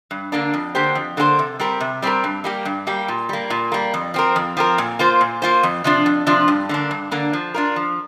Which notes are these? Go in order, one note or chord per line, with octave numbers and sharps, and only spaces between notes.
G2
D3 A#3 D4
F2
D3 A#3 G4 C5
F2
D3 A#3 G4 C5
C3
G3 C4 G4 A#4
C3
G3 C4 G4 A#4
G2
G3 A#3 G4
G2
G3 A#3 G4
A#2
G3 A#3
A#2
G3 A#3
F2
F3 C4 A#4
F2
F3 C4 A#4
A#2
A#3 F4 C5
A#2
A#3 F4 C5
F2
C3 F3 D4 F4
F2
C3 F3 D4 F4
G2
D3 A#3 D4
G2
D3 A#3 D4
F3
D4 F4 A#4
F3